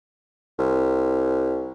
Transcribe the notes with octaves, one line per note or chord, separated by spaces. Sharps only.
C2